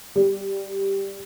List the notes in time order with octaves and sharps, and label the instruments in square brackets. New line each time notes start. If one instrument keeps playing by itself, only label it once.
[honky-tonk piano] G3